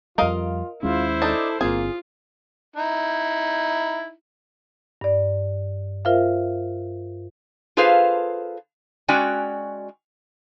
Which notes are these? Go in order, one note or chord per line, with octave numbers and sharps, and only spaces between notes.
F2 G3 F4 A#4 D#5 F5
D#2 G#3 C#4 E4 F4 C5
D4 D#4 A4
G1 G2 A#3 C4 F4 G#4
D#4 E4
G2 D5
F4 A#4 C5 E5 F5
F4 G#4 A4 B4 C5 F5
G#3 C#4 F#4 D5 G5 G#5